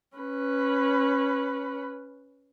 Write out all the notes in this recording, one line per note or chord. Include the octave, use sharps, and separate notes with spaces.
C#4 B4